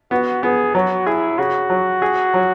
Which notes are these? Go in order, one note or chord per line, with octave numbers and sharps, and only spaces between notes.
B3 F#4
B3 G#4
F#3 F#4
E4 G#4
C#3 F#4
F#3
G#4
F#3